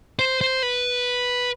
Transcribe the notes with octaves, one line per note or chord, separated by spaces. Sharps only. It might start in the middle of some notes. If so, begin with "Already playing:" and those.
C5
C5
B4